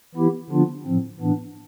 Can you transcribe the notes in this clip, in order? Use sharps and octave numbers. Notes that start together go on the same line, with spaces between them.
E3 B3 E4 G4
D3 F3 B3 D4 F4
A2 F3 C4
A2 E3 B3 D4